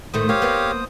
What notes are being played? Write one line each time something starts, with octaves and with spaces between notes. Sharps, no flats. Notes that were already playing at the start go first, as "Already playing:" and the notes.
A2 D#3 A3 C5 D#6
A#3 G4 C#5 F5
A#3 B3